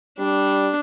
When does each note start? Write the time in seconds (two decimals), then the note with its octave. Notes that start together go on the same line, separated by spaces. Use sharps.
0.19 G3 D4